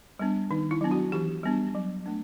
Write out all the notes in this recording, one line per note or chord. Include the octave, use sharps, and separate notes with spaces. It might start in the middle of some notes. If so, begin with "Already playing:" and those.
G3 B3 D4
D#3 D#4
E4
F#3 B3 D4
F#4
E3 G4
G3 B3 D4
F#3
A3 D4